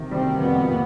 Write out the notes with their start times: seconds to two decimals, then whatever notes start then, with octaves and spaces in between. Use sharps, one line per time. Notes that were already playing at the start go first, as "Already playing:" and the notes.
Already playing: C3 D#3
0.11 G3 C4
0.41 F2 B3
0.70 A#2